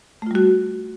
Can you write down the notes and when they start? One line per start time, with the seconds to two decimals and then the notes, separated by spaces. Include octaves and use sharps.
0.22 A3
0.26 F4
0.31 G3
0.35 F#4